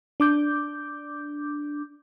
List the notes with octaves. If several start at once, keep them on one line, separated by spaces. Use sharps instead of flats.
D4 D6 G6